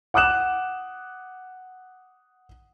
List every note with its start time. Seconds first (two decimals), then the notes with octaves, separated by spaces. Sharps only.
0.14 F#5 D6 D#6 F#6 E7